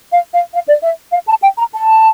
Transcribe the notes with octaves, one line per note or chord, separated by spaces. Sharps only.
F5
F5
F5
D5
E5
F5
A5
G5
A#5
A5